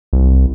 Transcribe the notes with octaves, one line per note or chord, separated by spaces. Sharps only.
C2